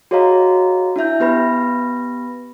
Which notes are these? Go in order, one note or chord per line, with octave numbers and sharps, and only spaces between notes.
F#4 G#4 C#5 D#5 F5 A#5
D4 E4 E5 G6
B3 G4 B4 B5 A#6